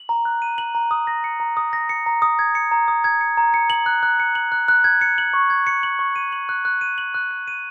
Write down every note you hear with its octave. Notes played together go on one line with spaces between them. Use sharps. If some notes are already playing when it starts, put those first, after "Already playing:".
Already playing: F#7
A#5
F#6
D#7
F#7
A#5
D#6
A#6
C#7
A#5
D#6
A#6
C#7
A#5
D#6
G#6
C#7
A#5
D#6
G#6
C#7
A#5
C#7
F#7
F#6
F#6
C#7
F#7
F#6
F#6
G#6
C#7
F#7
C#6
G#6
C#7
F#7
C#6
D#7
F#7
F#6
F#6
D#7
F#7
F#6
F#6
D#7